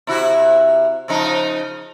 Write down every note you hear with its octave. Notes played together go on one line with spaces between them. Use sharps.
C3 E4 F#4
C#3 F3 D#4